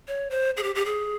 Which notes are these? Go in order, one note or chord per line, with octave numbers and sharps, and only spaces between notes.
C#5
C5
G#4
G4
G4
G#4